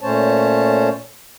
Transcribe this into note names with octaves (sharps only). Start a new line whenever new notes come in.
A#2 A3 C#4 C5 C#5 A5